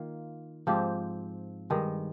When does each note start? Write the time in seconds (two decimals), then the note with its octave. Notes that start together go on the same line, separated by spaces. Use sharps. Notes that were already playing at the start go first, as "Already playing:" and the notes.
Already playing: D#3 A#3 F4
0.67 G#2 F3 C4 G4
1.70 G2 D#3 G#3